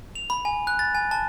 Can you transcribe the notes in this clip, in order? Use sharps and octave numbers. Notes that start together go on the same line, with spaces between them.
F7
B5
G#5
F#6
A6
G#5
A5